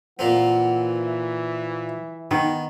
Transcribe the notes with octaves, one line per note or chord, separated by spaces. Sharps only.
A#2 E3 A#3 C4 F#5
E5
D#3 B3